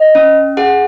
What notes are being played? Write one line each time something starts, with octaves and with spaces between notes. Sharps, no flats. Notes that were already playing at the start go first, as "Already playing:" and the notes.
Already playing: D#5
C#4
G#4 F#5